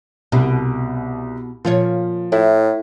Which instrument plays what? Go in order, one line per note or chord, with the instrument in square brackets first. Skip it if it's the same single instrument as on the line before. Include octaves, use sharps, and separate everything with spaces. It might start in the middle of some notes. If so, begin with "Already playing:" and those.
[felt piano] C2 [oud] B2
[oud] A#2 F4 C#5 [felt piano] F3
[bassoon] A2 [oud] E4